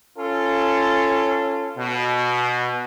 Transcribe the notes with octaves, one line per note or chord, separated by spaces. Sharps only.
C#4 F4 A4
B2